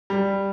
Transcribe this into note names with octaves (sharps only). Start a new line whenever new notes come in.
G3